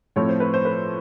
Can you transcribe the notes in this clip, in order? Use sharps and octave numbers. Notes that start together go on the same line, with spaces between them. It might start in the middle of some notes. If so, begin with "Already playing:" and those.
A2 F3 A3 C4 C#5
C5
B4
C5
B4